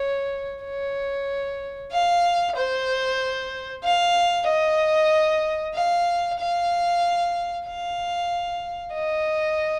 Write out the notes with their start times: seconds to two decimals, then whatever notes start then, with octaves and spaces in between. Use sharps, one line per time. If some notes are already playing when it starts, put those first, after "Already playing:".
Already playing: C#5
0.64 C#5
1.92 F5
2.56 C5
3.84 F5
4.47 D#5
5.75 F5
6.39 F5
7.66 F5
8.94 D#5